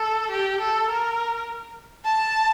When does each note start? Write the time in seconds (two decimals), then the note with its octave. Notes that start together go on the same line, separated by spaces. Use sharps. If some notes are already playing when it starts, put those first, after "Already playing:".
Already playing: A4
0.31 G4
0.60 A4
0.89 A#4
2.05 A5